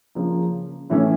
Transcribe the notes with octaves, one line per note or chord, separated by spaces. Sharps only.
C#3 F3 A#3
A2 E3 A3 C#4